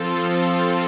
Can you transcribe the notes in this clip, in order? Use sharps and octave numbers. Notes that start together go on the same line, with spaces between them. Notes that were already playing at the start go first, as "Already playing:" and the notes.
Already playing: F3 C4 F4 A4